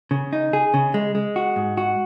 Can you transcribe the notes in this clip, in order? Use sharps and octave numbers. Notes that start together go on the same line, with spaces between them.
C#3
D#4
G#4
C#3
G#3
G#3
F#4
G#2
F#4